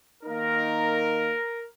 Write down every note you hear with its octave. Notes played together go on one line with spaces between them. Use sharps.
D#3 A#3 D#4 A#4